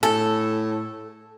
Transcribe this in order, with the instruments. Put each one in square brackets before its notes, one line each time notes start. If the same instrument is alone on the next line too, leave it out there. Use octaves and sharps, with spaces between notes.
[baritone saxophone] A2 [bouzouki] A4